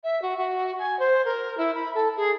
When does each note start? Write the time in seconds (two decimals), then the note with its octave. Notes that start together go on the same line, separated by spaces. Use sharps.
0.03 E5
0.22 F#4
0.37 F#4
0.78 G#5
0.99 C5
1.25 A#4
1.57 E4
1.74 B5
1.94 A4
2.16 G#4